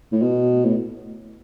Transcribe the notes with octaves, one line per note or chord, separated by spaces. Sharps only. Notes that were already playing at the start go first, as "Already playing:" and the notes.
A2
B2
A2